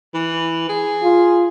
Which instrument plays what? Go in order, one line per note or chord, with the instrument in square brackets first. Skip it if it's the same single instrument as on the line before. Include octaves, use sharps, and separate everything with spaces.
[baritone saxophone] E3
G#4
[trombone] F4